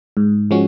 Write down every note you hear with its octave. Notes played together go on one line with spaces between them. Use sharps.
G#2
F3 G#3 C#4 F#4